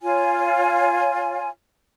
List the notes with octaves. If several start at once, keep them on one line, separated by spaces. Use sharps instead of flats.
F4 C#5 G#5